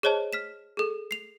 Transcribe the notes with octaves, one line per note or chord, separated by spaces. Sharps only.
G#4 C5 C#5 D#5 A5
F6 B6 E7
G#4 A4
C7 F7